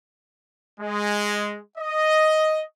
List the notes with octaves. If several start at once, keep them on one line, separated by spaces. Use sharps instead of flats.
G#3
D#5